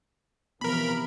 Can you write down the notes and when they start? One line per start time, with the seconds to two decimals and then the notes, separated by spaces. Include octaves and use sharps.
0.61 C3 E3 F3 B3 A#4 B5